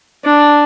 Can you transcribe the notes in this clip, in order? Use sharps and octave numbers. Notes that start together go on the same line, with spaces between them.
D4